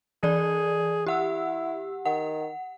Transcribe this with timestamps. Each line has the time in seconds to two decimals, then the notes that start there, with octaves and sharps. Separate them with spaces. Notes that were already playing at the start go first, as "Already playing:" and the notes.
0.23 E3 G#4 D5
1.07 E4 G4 F#5 E6
2.05 D#3 F#5